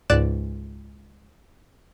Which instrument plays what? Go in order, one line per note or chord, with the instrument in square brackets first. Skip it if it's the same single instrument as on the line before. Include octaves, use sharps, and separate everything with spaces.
[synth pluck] C#2 G#2 D5 F#6 E7